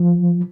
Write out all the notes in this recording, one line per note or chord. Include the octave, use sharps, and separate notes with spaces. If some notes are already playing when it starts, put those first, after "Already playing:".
Already playing: F3